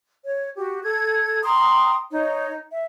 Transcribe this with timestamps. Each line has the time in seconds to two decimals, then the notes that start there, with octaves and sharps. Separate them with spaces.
0.24 C#5
0.57 F#4 G4
0.83 A4 G#6
1.42 G5 A#5 C6 D#6
2.09 D#4 C#5
2.71 E5